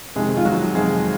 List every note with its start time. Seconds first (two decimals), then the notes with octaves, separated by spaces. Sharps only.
0.16 F2 C3 D#3 G#3 G#4
0.37 F4
0.45 F#3 F#4
0.75 F2 C3 D#3 G#3 G#4